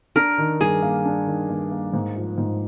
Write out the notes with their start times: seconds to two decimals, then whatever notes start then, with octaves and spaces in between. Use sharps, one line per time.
0.16 D4 A#4
0.38 D#3
0.61 G2 G#4
0.82 A#3
1.05 D4
1.27 D#3
1.49 G2
1.71 A#3
1.93 G#2
2.16 F3
2.38 G#2